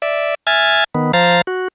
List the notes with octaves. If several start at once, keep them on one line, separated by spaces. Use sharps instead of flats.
D5 E5
E5 G#5 F6 G#6 A6
D#3 B3
F3 C5 F5 A#5 A6
F#4